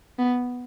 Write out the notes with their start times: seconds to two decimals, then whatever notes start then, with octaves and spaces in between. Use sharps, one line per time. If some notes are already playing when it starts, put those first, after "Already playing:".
0.19 B3